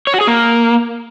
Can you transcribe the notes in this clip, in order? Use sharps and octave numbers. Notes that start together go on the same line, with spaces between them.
C#5
F#4
G#4
A#3